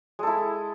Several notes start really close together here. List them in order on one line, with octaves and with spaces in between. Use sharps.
G#3 A4 E4